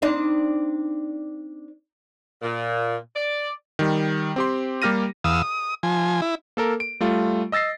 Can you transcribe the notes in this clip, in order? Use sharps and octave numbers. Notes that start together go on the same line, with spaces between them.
C4 D4 D#4
A#2
D5
D#3 G3
C4 G4 C6
G3 A#3 G4 F6 A#6 D#7
E2 F5 D#6 E6
D#6
F3 G#5
E4
A#3 A4 A#4
D7
G3 A3 F4
D#5 E6 A6 A#6 C7